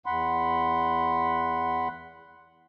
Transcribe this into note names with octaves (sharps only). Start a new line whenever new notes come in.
E2 F#5 B5 C6